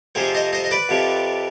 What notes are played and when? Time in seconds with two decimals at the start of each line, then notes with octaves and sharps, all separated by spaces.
0.15 F2 C3 F3 G#4 C5
0.34 C5 D#5
0.53 C5 D#5
0.64 D#5
0.71 B4 D5
0.89 F2 C3 F3